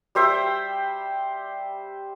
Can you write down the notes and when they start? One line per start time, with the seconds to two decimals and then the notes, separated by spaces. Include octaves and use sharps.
0.15 G3 C5 E5 G5